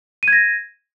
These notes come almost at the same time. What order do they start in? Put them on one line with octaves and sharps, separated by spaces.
D#7 G#6 A#6